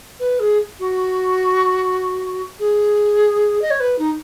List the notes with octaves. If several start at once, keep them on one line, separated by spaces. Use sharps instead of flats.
B4
G#4
F#4
G#4
D#5
C#5
B4
D#4